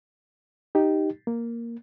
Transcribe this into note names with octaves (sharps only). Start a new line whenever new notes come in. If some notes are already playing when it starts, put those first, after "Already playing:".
D#4 G4
A#3